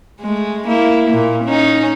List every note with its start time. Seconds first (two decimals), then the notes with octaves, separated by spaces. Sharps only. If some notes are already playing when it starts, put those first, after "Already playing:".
0.21 G#3 A3
0.67 A#3 E4
1.10 A#2 A#3
1.44 C#4 D#4